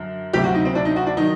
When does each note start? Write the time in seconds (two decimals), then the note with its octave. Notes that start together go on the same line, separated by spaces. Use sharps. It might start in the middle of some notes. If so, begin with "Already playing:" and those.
Already playing: F#2 D3 F#3
0.33 D2 C3 F#3 G4
0.44 F#4
0.55 D#4
0.65 C4
0.75 D4
0.85 D#4
0.96 F#4
1.06 D4
1.17 D#3 F#3 D#4